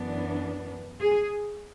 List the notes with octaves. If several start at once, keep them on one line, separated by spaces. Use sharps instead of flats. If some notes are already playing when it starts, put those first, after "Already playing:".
Already playing: F#2 E3 B3 D4
G#4